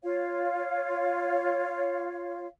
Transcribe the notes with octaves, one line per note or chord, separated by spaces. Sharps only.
F4 C#5 F5